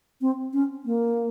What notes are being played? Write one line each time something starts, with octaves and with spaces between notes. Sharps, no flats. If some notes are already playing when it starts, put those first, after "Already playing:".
C4
C#4
A#3